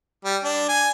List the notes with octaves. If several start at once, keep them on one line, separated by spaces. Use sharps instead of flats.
G3
D4
G#5